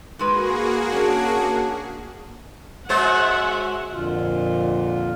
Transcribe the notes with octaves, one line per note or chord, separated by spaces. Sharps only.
G#2 G#3 A#3 F#4 G#4 B4
C#4 D4
F#3 G#3 C5 E5 F#5
F2 A#2 D3 F4